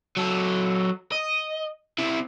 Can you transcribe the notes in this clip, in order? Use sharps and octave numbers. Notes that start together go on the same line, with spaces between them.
F#3 A4
D#5
C4 E4